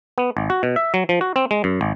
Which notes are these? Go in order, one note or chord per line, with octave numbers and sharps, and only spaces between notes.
B3
G#1
F#4
B2
E5
F#3
F3
F#4
C4
G#3
F#2
G#1